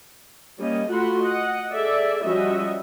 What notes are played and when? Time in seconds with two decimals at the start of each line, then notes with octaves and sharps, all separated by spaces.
0.59 G3 A#3 C#4 D#5
0.89 A3 F4 F#4 F#5 B5 C6
1.22 D#5 F#5
1.72 G#4 A4 D5 E5
2.23 F3 G3 C#4 F#4 D#5 E5